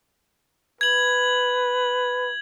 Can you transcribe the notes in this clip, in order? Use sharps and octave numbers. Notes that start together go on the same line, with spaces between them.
B4 G#6 F#7